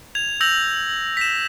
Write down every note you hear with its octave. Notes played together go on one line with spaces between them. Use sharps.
G#6 F7
E6 G6 A#6 F7 F#7
B6 E7